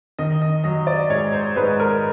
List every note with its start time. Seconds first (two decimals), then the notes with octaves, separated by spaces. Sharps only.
0.19 D#3 D#5
0.42 D#5
0.64 F#3 D#5
0.87 D5
1.10 G#2 C#5
1.33 C5
1.56 G#2 B4
1.80 A#4